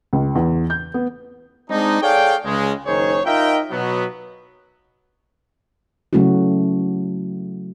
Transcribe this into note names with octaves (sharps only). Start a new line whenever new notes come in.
C#2
E2
G6
B3
G#3 C4 D4 D#4
G#4 A4 C#5 D5 F5 G5
C#2 C#3 G#3
F#1 D#3 G#4 C5 C#5
D#4 F4 A#4 D#5 E5 G5
B2 F#3 B3
C#3 F#3 A3 C#4 E4 F#4